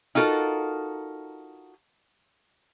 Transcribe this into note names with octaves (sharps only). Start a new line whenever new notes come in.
D#4 F4 F#4 A4 A#4